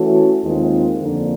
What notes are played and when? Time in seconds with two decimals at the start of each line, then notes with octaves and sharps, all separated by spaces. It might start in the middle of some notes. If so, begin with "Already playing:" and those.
Already playing: E3 A3 C#4 F#4 A4
0.42 D#2 D#3 G#3 C4 F4
1.00 F2 D3 F3 A#3 D4